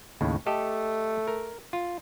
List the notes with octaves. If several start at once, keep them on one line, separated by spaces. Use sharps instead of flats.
D#2 A2 C#3
A3 G4 A4 D#5
A#4
F4